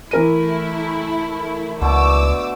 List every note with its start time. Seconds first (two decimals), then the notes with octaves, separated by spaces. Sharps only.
0.11 E3 A3 E4 A#4 D#7
1.82 C#2 B2 D3 A3 D6 E6